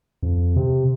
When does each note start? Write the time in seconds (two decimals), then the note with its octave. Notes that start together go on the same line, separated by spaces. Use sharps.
0.23 F2
0.56 C3